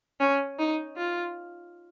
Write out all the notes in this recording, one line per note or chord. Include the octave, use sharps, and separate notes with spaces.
C#4
D#4
F4